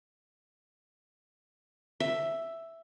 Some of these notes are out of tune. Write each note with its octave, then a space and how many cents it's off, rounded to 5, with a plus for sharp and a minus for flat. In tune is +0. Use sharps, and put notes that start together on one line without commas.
E5 +5